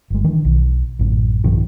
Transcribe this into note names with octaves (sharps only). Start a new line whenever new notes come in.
G1 G#3
D#3 E3 D4
B1
A1 F#2
B1 G2 D#3 F3